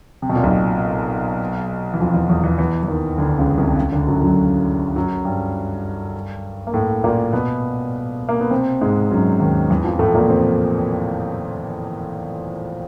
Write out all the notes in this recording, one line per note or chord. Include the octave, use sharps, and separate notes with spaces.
C3
B2
A#2
B1 B2
E3
F2 F3
E2 E3
E2 E3
E2 E3
E2 E3
E3
D#2 D#3
D2 D3
C#2 C#3
C2 C3
C#2 C#3
D2 D3
F#2 F#3
F#2 F#3
F#2 F#3
G2 G3
A#3
A2 A3
A#2 A#3
B2 B3
A#3
B3
C3 C4
G#2 G#3
F#2 F#3
D#2 D#3
E2 E3
F2 F3
A2 A3
A#2 A#3
C3 C4